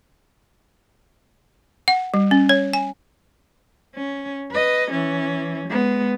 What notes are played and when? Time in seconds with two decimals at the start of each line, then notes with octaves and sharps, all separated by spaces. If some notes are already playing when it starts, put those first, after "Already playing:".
1.88 F#5
2.14 G3
2.31 C#4
2.49 C#5
2.73 G#5
3.95 C#4
4.51 B4 D#5
4.91 E3 C#4
5.68 G#3 B3